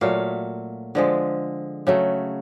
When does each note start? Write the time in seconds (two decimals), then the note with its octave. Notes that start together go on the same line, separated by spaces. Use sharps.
0.01 A#2 F#3 A3 F5
0.95 D3 F3 G#3
1.87 C#3 F#3 A3